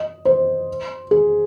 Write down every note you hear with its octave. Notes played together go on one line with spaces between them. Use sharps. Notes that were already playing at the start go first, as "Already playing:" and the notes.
Already playing: D#5
C5
G#4